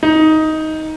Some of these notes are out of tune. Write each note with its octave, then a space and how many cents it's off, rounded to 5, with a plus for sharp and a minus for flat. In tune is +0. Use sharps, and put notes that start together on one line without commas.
D#4 +10